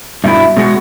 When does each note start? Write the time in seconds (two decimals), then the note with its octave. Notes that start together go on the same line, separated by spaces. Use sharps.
0.24 G2 B2 E4 E5
0.57 B2 G#3 F#4